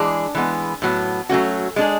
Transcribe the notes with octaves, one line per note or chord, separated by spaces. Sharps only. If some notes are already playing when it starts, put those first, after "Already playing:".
Already playing: E3 G#3 D4 G#4
E3 G#3 B3
A2 F#3 B3
F#3 A3 C#4 F#4
G#3 D4 G#4